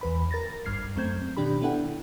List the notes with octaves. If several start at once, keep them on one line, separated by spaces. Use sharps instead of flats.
E2 B4 B5
A#4 A6 A#6
G#1 G2 F6 G#6 C7
F#2 A3 C4 G6 G#6
B2 D#3 D4 G4 B5
B3 D4 E4 A4 F#5 G5